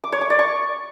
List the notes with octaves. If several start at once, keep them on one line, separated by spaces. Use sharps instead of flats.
D6
C#5
D6
D5
C#6